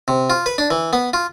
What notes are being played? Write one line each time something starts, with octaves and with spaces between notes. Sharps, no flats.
C3
F4
B4
D4
E3
B3
F4